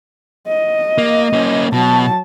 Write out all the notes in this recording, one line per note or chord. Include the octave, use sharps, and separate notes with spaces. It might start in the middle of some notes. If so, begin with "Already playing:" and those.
D#5
A#3
A#3 C#4
B2 F#3 A5